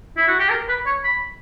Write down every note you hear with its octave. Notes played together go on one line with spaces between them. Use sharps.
E4
F#4
G4
A#4
B4
C#5
B5